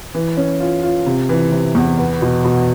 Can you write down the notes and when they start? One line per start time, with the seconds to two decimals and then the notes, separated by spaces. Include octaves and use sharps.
0.14 E3
0.37 C#4
0.60 F4
0.83 F4
1.06 C3
1.29 E3
1.52 C3
1.75 E2
1.98 B3
2.22 B2
2.45 B2